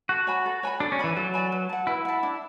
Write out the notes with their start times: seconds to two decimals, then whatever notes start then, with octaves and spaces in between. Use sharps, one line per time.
0.09 F#4 A4
0.27 C#5 G#5 B5
0.46 A4
0.63 C#5 G#5 B5
0.80 D4 A4
0.92 C#4
0.99 E3 D5 G#5 B5
1.17 F#3 A4
1.34 D5 G#5 B5
1.52 B4
1.69 F#5 A5
1.87 E4 B4
2.05 F#5 A5
2.23 D4